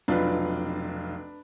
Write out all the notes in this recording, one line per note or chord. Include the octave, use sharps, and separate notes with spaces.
F1 B1 D4 F4 B4